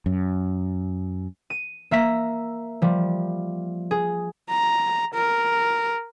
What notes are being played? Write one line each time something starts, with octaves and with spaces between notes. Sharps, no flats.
F#2
D#7
A#3 E5 A#5 B6
F3 G3
G#4
A#5
A#4